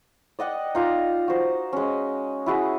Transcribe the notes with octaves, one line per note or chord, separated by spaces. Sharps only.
D5 D#5 F#5 G5
D#4 F4 D5 A#5
F#4 C5
G#3 C#4
E4 F#4 G#4